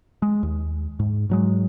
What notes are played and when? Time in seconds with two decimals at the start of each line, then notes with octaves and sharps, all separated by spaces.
0.22 G#3
0.43 D#2
0.99 G#2
1.30 G#2 F#3 G#3